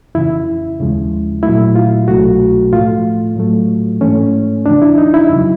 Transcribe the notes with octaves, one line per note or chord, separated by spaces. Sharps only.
F2 C#3 E3 E4
D#2 C#3 F3 G#3
A#2 F#3 A3 E4
F4
C2 B2 F#3 A3 F#4
A2 F3 A3 F4
A2 F#3 A3
G#2 E3 A3 C#4
E2 C#3 F3 D4
E4
D#4
E4
F2 C#3 F#3